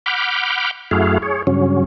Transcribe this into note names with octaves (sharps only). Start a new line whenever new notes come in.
F#5 B5 D6 F6 G6
F#2 A3 E4 F#4 G#4 F5
G#4 C#5
G2 C#3 F#3 C#4